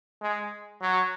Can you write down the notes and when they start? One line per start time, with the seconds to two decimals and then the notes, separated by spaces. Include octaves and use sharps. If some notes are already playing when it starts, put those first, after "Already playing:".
0.21 G#3
0.81 F#3